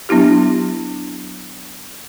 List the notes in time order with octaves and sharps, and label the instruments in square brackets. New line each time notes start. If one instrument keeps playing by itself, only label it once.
[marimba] F#3 B3 D4 E4 G4